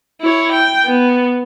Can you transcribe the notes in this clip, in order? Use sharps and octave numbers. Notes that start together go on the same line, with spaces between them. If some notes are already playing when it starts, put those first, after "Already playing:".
E4 C#5
G5
B3